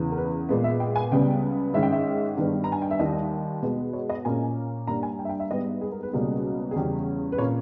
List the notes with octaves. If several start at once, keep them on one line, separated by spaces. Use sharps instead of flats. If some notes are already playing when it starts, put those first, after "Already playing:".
Already playing: E2 C#3 E3
A#4
B4
A#2 G#3 B3
E5
G5
G#5
C#2 C#3 G3 B3 G5
G#2 D#3 G#3 C#4 E5
G5
E5
G2 D#3 G3 B3
A#5
G#5
G5
E5
D#2 D#3 G3 D#5
B2 G#3 B3
C#5
D#5
A#2 A#3 C#4 G#5
G2 G3 A#3 A#5
G#5
G5
E5
G5
E5
G#2 G3 B3 D#5
G#4
A#4
B4
C#2 B2 G3 A#3 C#4 G#4
G#4
E2 C#3 G3 C#4 G4
B4
A#2 A#3 C#4 C#5